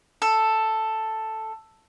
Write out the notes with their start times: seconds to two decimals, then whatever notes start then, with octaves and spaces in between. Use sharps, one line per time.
0.22 A4